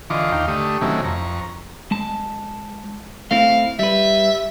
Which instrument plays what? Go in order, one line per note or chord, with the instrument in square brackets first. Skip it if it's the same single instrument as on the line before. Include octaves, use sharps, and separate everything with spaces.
[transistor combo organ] D3 E3 F4 D#5 C#6 D6
D#2 D#4 F5 G5
D3 A3 G4 C#6 D#6
C3 D#3 F#3 A3 C#4 E4
F2 A#5 C#6
[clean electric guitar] G#3 A5
[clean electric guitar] A3 C4 E4 [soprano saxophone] F5
[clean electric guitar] G3 B4 [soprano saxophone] E5